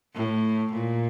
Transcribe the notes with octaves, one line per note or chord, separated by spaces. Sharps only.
A2
A#2